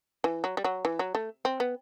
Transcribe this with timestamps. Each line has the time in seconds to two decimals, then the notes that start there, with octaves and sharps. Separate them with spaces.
0.24 E3
0.44 F#3
0.57 G3
0.64 F#3
0.85 E3
0.99 F#3
1.15 A3
1.45 C4
1.60 B3